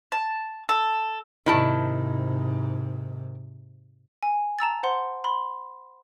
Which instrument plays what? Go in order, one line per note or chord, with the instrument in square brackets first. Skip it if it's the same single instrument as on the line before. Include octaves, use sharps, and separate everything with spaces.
[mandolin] A5
A4
[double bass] G#2 C3 [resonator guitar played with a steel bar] D#3 E4 A5
[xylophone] G#5
A5 A#5 E6 A6
C5 F#5 C6
B5 C6